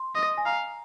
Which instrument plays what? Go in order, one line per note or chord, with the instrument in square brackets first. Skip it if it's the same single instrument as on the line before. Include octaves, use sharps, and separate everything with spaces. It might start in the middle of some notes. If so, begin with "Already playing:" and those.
Already playing: [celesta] C6
[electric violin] D#5
[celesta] G#5
[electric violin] F5 [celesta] A#5